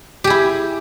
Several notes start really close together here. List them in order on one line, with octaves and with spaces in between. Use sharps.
G4 G#4 E4